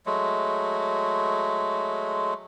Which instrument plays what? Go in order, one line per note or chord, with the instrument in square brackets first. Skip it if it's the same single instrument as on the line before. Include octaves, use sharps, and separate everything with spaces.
[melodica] F#3 G#3 A3